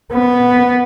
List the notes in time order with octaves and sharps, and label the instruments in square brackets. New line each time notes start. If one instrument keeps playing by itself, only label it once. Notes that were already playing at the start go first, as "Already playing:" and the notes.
[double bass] B3